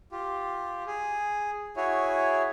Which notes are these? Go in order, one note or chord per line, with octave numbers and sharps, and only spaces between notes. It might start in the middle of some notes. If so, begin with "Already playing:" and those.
F4 G4
G#4
E4 F#4 G#4 C#5